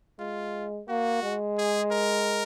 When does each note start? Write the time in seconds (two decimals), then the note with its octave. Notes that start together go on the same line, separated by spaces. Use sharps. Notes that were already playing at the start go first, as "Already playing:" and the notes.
0.19 G#3 F4
0.89 A#3 F#4
1.23 G#3
1.58 G#4
1.92 A#4